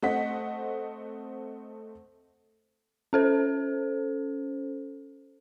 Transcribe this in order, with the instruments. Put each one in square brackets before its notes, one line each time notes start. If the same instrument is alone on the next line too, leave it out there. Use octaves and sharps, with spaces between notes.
[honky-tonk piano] A3 C4 D#5 F#5 B6
[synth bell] C#4 A4 C5